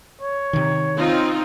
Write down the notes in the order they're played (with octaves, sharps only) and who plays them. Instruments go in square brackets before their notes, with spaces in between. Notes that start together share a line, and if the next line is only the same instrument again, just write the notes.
[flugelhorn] C#5
[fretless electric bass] C3 D#3
[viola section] C4 D#4 F4